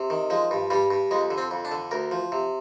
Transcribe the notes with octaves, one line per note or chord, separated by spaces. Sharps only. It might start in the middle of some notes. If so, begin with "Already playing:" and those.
Already playing: C3
D#3
F3 G#3
G2
G2 G3
G2
F2 G#3
D3
C4
F2
D4
D3
D2 A#4
F3
C3